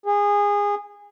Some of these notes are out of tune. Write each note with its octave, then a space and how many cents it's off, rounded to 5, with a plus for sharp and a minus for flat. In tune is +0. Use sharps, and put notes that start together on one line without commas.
G#4 -25